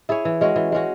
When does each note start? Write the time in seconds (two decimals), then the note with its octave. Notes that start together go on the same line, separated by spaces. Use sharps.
0.09 E4 G#4 C#5
0.25 E3
0.41 G#3 C#4 F#4
0.56 E3
0.72 G#3 C#4 F#4